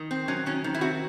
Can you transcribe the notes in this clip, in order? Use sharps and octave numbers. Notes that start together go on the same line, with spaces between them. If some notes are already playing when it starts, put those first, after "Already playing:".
Already playing: D#3
C4
F#3 C#4
D#3 C#4
D#3
E4
C4 F#4